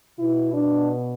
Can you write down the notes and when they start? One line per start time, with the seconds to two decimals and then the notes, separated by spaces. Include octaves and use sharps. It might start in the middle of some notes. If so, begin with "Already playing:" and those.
0.19 B2 E4
0.54 D4